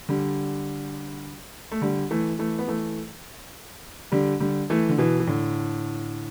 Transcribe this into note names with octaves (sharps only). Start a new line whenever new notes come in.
D3 G3
A3
D3 G3
E3 A3
E3 A3
B3
E3 A3
D3 G3
D3 G3
E3 A3
D3
B2 E3
E3
A2 D3